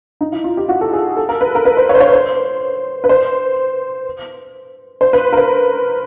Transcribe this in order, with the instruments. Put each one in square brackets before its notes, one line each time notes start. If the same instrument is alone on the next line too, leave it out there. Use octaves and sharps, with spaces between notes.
[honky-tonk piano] D#4
E4
F4
G4
F#4
A4
G#4
A4
A#4
B4
A#4
B4
C5
C#5
C5
C#5
C5
B4
C5
C5
B4
A#4
B4